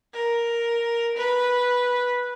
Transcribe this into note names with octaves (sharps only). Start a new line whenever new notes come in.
A#4
B4